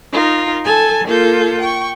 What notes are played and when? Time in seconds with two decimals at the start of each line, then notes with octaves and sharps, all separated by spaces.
0.12 D#4 F4 A#4
0.65 A4 G#5 A5
1.06 A#3 F4 A4 G6
1.60 G5 C#6